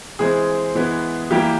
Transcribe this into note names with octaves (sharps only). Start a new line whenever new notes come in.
E3 G#3 C4 G#4
E3 G#3 B3
E3 G3 A#3 G4